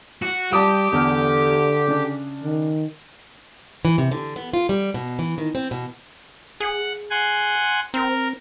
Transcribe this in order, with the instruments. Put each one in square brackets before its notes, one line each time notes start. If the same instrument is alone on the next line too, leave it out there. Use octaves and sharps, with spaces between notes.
[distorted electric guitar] F#4
[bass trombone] G3 [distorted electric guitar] G4 [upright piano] A5 D6 D#6
[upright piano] E2 A4 F6 [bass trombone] D3
[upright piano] C#3 D4
[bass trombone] D#3
[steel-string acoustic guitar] E3
C3
D3
B3
F4
G3
B2
E3
D#3
C4
B2
[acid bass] G#4 [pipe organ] F#5
[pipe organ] F#5 G#5 C6
[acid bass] C4 [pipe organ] A#4